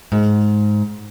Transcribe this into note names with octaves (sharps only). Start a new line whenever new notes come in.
G#2